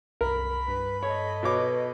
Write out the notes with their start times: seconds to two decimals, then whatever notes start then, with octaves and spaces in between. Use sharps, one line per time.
0.21 C2 F#2 A#4 B5
0.68 G2 B4 B6
1.03 A4 C#5 D#5
1.43 B2 B4 C#5 D6